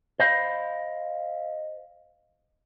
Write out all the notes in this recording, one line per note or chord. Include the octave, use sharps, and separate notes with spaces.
C5 D#5 F5 B5